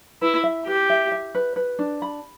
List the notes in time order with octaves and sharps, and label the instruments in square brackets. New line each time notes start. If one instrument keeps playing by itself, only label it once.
[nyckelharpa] E4 [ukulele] B4
[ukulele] E5
[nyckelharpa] G4 [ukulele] B4
[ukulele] E5
E5
B4
B4
D4
B5